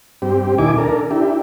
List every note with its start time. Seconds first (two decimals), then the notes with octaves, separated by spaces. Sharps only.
0.22 G2 C4 G4
0.58 D#2 A#2 D#4 E4 G#5 D6
0.78 D4 A4 A#4
1.11 D4 E4 G4